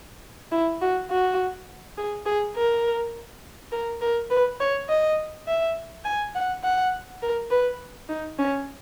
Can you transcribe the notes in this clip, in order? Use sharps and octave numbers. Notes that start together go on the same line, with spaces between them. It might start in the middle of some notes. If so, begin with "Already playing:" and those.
E4
F#4
F#4
G#4
G#4
A#4
A#4
A#4
B4
C#5
D#5
E5
G#5
F#5
F#5
A#4
B4
D#4
C#4